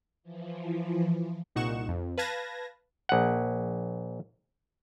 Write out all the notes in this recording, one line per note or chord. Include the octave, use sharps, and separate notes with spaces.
E3 F3
C2 A#2 D#4 F#5 C#6 E7
F2
B4 F5 A5 G#6 A#6
A#1 F#5